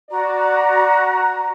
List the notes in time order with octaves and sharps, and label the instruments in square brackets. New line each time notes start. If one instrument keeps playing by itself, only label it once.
[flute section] F#4 A#5 [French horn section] D5